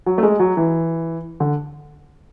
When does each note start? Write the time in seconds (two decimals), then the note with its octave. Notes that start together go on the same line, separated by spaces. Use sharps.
0.06 F#3
0.18 A3
0.23 G#3
0.40 F#3
0.57 E3
1.40 D3